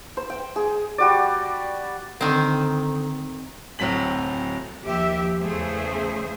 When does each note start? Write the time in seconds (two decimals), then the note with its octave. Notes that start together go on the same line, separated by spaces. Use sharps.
0.17 C5
0.30 G5
0.56 G#4
0.98 G3 F#4 D5
2.21 D2 D3 D#3 C4
3.79 D1 A2 F#3 C4 B6 F#7
4.83 D#2 F3 G4 E5
5.39 E2 C#3 A3 G#4 C5